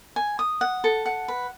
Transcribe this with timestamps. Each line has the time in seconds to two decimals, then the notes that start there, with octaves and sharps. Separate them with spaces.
0.16 G#5
0.39 D#6
0.61 F#5
0.84 A4
1.06 F#5
1.28 B4